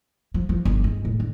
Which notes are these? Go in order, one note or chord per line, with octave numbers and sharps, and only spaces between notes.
F3
F3
G1
G#3
A2
D3